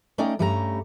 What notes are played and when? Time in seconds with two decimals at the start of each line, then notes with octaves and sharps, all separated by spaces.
0.18 A3 C#4 D#4 D5 D#5 G5
0.39 G2 G3 A3 C#4 G#4 A#5